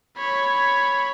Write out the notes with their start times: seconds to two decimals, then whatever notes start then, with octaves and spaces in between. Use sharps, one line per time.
0.17 C#5 B5